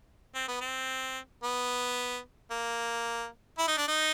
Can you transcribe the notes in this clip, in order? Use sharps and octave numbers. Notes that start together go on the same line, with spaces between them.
C4
B3
C4
B3
A#3
E4
D#4
D4
D#4